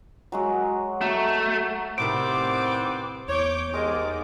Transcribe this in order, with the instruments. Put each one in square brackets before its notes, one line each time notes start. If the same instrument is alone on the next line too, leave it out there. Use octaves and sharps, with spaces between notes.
[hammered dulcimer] F#3 G#3 F#4
[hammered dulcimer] F#3 [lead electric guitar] A3
[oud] A2 C3 D#3 [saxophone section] G3 B3 C4 [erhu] D6 [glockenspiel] D7
[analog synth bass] E2 [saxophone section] C#5 [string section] D6 G6
[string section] G#2 D6 [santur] G#3 [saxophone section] G4 A#4 D#5